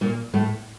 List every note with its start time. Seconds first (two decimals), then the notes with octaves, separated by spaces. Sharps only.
0.01 A#2 A#3
0.34 A2 A3